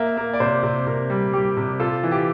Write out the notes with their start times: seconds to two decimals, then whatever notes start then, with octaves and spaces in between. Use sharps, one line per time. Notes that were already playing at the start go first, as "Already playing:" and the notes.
Already playing: A#3 E5
0.17 A#3
0.33 D5
0.40 C3 C5
0.63 C3
0.87 C3 A#4
1.10 G3
1.33 G3 G4
1.57 C3
1.80 F4 A4
2.03 E3
2.11 G4